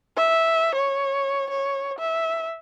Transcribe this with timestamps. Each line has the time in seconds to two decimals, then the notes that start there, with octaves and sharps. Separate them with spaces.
0.16 E5
0.75 C#5
1.50 C#5
1.99 E5